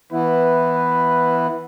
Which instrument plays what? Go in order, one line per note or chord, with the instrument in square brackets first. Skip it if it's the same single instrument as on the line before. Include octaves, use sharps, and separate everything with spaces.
[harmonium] E3 B3 E4 [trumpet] B4